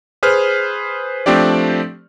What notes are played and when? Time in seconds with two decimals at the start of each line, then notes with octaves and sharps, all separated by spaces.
0.23 G#4 B4 C5 F6
1.26 F3 A3 C4 D4 G4 D5